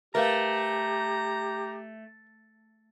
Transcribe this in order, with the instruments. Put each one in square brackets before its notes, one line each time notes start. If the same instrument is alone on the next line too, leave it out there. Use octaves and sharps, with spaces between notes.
[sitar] A3 [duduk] G4 [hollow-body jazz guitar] A#4 B4 F5 [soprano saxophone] A#5